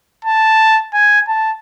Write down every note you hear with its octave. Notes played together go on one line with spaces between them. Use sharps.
A5
G#5
A5